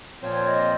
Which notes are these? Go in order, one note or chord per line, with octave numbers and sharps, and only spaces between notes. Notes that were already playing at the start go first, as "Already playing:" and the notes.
A#2 F3 C4 F4 C5 C#5
D#5